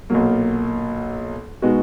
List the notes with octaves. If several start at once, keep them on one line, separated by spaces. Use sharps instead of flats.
B1 A#2 F#3 A#3
B2 G#3 B3 D#4 F#4